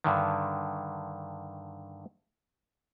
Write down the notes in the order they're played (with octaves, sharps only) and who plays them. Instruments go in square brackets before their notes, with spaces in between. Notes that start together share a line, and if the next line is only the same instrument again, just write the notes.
[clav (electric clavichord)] G2 D3 D#3